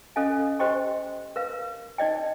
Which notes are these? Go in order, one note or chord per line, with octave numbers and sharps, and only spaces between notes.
C#4 A4 D#5 F5 G#5
G4 C5 D#5 G5 C6 C#6
A#4 B4 F5
D#4 D5 D#5 G5